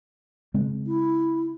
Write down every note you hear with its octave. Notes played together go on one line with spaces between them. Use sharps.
C#3 G#3 C4
E4